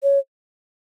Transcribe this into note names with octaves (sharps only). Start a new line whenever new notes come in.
C#5